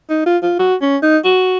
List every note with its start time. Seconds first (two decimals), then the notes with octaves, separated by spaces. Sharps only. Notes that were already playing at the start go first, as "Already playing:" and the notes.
0.09 D#4
0.26 F4
0.43 F4
0.59 F#4
0.82 C#4
1.02 D#4
1.24 F#4